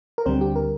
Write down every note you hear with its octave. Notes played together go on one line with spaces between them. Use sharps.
A#4
D2 D3 G3 C4 C5
G4
A#4